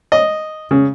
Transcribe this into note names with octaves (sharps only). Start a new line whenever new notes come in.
D#5
C#3